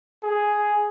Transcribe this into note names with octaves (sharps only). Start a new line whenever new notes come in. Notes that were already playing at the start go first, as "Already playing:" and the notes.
G#4